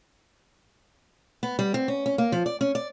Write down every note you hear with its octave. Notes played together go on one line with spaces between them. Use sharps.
B3
G3
C4
C#4
C#4
A#3
F3
D5
C#4
D5